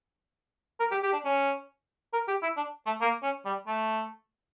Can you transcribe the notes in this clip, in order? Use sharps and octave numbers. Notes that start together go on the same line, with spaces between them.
A#4
G4
G4
D4
C#4
A#4
G4
E4
D4
A3
A#3
C#4
G3
A3